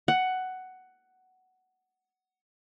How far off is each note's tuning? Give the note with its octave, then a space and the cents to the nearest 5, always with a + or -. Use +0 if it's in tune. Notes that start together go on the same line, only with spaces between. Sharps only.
F#5 +10